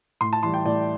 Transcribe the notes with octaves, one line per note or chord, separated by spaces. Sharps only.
A2 C6
A5
E3 G3 C6
G5
A2 D5